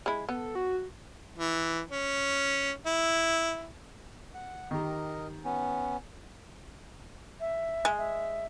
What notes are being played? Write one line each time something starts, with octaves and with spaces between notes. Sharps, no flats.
G#3 E4
B3 A4
F#4
E3
C#4
E4
F#5
D#3 G4 A#4 D#5
B3 C#4
E5
G#3
E5